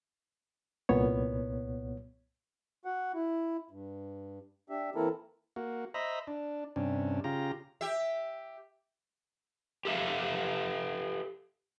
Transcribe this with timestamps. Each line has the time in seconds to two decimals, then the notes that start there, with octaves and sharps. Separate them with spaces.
0.89 C2 A#2 B3 C#5
2.85 F#4 F#5
3.14 E4
3.71 G2
4.70 D4 G4 E5
4.95 E3 A#3 C4 E4 A4 A#4
5.56 A#3 F#4
5.94 C5 D#5 E5 A#5 B5
6.27 D4
6.76 G2 C3 C#4 D4
7.24 C#3 F4 G4 A#5
7.81 G4 E5
9.85 G4 A4 E5 F5